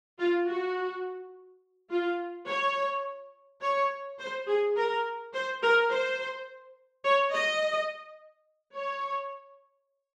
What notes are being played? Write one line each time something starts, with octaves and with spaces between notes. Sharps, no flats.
F4
F#4
F4
C#5
C#5
C5
G#4
A#4
C5
A#4
C5
C#5
D#5
C#5